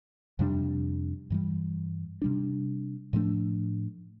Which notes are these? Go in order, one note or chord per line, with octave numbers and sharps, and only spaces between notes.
F2 C3 G3 D4
G2 E3 G3
C3 G3 D4
A2 F3 A3 D4